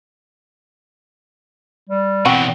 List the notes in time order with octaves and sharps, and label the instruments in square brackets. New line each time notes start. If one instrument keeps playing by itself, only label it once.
[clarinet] G3
[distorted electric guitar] E2 B2 [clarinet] C4 [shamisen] F#4